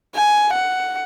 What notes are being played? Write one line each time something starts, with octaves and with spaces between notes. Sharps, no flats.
G#5
F#5